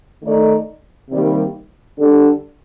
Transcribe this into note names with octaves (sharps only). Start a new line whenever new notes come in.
D#3 A3 D#4 A4 D5
C3 D#3 G3 A#3
D3 G3 D4 A4